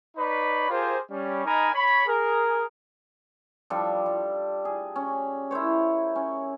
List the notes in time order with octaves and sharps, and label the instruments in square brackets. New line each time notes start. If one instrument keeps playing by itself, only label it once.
[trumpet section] D#4 B4 C#5 D5 B5
F4 G4 G#4 A#4 C5
G3 C#4
D#4 A#4 D#5 G#5 A#5 B5
C#5 B5
G#4 A#4
[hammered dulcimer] F3 G3 D4 A4
G3
G#4
C#4
E4 A#4 C5 C#5
C#4